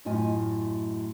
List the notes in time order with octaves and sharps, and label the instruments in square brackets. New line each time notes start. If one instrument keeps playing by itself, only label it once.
[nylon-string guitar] F#2 A2 F4 D#5 G#5